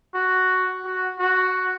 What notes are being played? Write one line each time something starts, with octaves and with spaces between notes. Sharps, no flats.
F#4
F#4
F#4